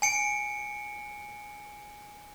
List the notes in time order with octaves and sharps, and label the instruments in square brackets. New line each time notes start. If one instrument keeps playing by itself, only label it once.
[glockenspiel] G#5 C#7 D7